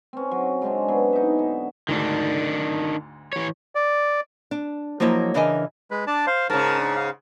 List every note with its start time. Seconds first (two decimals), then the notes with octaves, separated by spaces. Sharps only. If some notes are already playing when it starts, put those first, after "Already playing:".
0.13 C4 C#4
0.31 F#3
0.62 C#3 G#3 C4 D4
0.88 F#3 B3 G#4
1.13 D#4 E5
1.39 D3
1.89 D2 G#2 D#3 D4
3.33 E3 C#5
3.75 D5
4.51 D4
5.00 F3 F#3 A#3 E4 C#5 D#5
5.34 C#3 E3 D4 A#4 D#5 G#5
5.91 G#3 B4
6.07 D4 D5 A5
6.27 C5 F5
6.50 G#2 C#3 A#4 A5
6.78 D4 D5
6.96 F5